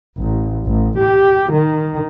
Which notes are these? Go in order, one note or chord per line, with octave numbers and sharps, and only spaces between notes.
A1
A1
G4
D#3